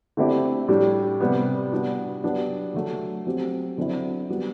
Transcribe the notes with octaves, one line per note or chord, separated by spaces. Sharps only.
D3 A3 C4 E4 G4
A2 G3 D4 G4
C3 G3 B3
G3 B3 D4 F#4
F#3 B3 D4 G4
D3 F#3 A3
F#3 C4 G4
D3 F#3 C4 E4
G3 B3 F#4